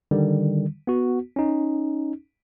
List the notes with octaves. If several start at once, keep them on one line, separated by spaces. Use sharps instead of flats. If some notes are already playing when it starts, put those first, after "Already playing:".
D3 D#3 G3
B3 F#4
C#4 D#4